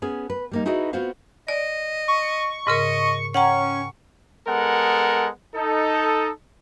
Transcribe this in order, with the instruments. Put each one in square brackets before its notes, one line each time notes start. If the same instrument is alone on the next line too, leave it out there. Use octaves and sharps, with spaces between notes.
[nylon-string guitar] B3 C#4 G#4
B4
G3 A#3 D#4
D#4 E4 F#4 G#4 B4 D#5
B3 C4 F4 F#4 C5 F5
[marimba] D5 [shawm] D#5
[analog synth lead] C#6
[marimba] G#2 C#3 A#4 [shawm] D#5
[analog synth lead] C#4 [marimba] F#5 G5 A#5 [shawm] C#6
[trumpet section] G#3 B3 A4 A#4 F#5
D#4 A4